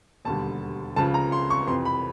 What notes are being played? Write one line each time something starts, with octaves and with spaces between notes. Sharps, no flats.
E1 D#2 D3 G3 A5
C#2 C#3 F3 A5
A#5
C6
C#6
F2 C3 E3 C6
B5